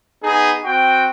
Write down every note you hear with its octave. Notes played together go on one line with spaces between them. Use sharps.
B3 D#4 G#4
C4 F#4 G5